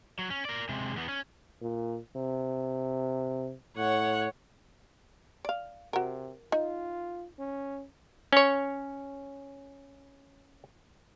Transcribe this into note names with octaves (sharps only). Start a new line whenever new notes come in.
F#3
C#4
A#4 D5
C3 G#3
E2 B3
C#4
A#2
C3
A2 C#5 F#5
D5 F5
C3 F#4 A#4
D#4 F4
C#4
C#4 C#5